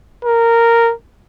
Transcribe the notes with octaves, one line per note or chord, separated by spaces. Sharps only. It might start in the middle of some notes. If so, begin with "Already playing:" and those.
A#4